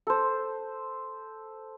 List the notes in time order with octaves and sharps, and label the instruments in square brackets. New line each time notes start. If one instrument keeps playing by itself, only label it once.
[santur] A4 C5